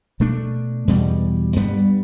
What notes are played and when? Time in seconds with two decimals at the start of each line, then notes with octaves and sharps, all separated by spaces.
0.20 B2 A3 D4
0.88 E2 B2 G3
1.56 G2 G3 B3